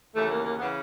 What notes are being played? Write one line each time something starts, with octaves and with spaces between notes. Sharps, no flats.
D#2 C#3 E3 A3
A#3
A#3
C#3 E3 B3